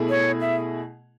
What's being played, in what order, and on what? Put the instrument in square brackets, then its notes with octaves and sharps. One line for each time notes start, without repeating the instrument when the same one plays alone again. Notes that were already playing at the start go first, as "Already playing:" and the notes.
Already playing: [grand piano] B2 A3 E4 G#4
[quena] C#5
E5